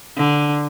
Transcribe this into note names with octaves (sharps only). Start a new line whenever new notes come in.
D3